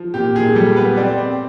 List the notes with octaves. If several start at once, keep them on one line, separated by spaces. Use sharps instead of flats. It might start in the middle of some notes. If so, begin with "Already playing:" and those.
Already playing: F3
A#2 G4
A#2 G#4
G3 A4
B3 B4
C4 D5
C4